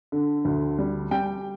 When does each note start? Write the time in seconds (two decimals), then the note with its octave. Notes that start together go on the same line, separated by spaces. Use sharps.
0.12 D3
0.45 D2
0.78 G3
1.11 G3 G5